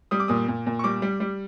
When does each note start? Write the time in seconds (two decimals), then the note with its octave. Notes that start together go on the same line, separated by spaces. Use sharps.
0.11 G3 D#6
0.20 D6
0.28 A#2 D#6
0.48 A#2
0.67 A#2
0.79 C#6
0.84 G3 D6
1.02 G3
1.20 G3